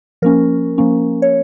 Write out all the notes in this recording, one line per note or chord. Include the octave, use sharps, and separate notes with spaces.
F3 A#3 C#4 A#4
F3 A#3 C#4
C#5